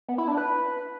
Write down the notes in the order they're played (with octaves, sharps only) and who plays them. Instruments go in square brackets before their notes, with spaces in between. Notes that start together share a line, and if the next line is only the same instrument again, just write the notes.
[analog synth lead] B3
E4
D4
B4